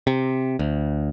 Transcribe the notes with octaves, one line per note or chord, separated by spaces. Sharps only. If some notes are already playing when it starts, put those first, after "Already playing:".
C3
D2